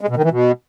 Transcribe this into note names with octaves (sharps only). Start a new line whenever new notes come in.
G#3
B2
D#3
E3
B2